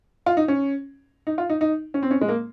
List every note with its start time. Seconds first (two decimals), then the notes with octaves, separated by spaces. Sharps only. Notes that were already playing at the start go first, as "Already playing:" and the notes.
0.26 F4
0.37 D#4
0.48 C#4
1.27 D#4
1.38 F4
1.50 D#4
1.61 D#4
1.94 C#4
2.03 C4
2.11 C#4
2.21 G#3
2.28 A#3